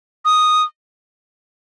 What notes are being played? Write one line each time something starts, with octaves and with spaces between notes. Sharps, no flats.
D#6